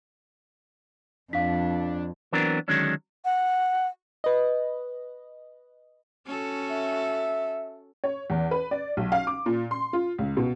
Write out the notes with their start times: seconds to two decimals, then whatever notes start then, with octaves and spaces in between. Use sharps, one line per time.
1.33 F2 D4 F5 B6
2.33 E3 F#3 B3 C4 D4 A#4
2.68 D3 D#3 F#3 G#3 C#4 D4
3.25 F#5
4.24 B4 D#5
6.26 C#4 F#4 A4
6.71 E5
8.04 C#5
8.30 E2
8.51 B4
8.71 D5
8.97 B1
9.12 F5
9.27 D6
9.46 A#2
9.71 C6
9.93 F4
10.18 C#2
10.37 B2